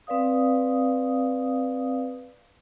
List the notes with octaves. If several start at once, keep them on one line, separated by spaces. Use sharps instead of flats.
C4 B4 D5 F5 D#6